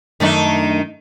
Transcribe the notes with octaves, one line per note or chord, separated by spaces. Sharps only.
F#2 D#3 A3 D4 D#4